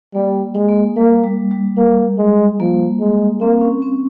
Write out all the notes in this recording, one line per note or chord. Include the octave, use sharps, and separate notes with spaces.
G3 A#3
G#3
A#3
G3 A#3
G3
G3
A#3
G#3
F3 A#3
G#3
A#3 C4
C#4
C4